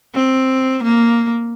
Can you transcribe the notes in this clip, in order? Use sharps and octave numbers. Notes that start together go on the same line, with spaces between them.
C4
A#3